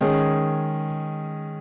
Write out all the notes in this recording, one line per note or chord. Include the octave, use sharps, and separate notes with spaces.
D#3 G#3 C#4 G#4